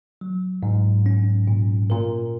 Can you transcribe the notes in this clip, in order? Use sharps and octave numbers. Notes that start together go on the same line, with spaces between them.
F#3
G#2
C#4
A#2
A#2 A#4